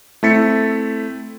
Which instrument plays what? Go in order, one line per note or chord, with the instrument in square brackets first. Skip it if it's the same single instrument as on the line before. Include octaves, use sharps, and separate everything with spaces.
[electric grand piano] A3 C4 E4 A6 B6 C#7